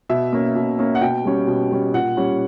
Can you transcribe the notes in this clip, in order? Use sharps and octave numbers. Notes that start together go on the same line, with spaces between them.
B2 E5
A#3 C#4
B2
A#3 C#4
F#5
B2 G5
G3 C#4
B2
G3 C#4
A#2 F#5
G3 C#4